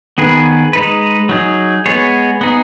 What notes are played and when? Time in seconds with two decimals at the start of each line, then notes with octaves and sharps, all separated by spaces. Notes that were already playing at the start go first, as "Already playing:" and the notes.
0.18 D#3 B3 G#4 B4
0.73 G#3 D#4 B4
1.29 F#3 D#4 G#4
1.86 G#3 B3 G#4 C#5
2.41 B3 D#4 G#4